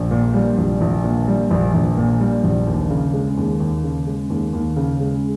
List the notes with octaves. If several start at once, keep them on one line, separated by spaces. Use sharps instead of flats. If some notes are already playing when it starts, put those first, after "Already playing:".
Already playing: A#1
A#2
G3
A#1
A#1
A#2
G3
A#1
A#1
A#2
G3
A#1
D#2
C#3
G#3
D#2
D#2
C#3
G#3
D#2
D#2
C#3
G#3